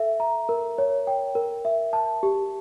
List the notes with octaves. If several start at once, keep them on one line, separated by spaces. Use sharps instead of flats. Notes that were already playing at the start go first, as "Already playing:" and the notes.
Already playing: A4 E5
A#5
A#4
C#5
G5
A#4
E5
A5
G4